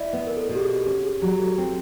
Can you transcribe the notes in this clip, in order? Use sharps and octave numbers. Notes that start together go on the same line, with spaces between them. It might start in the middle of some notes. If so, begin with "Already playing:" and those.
Already playing: E4 D5 D#5
B3 B4
A#4
A4
B2
G4
G#4
C#4 G4
G#4
F#3 G4
A4
C4